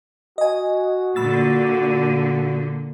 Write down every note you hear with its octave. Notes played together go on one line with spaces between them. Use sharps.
F#4 D#5 G#5
A#2 D3 B5 E6 A6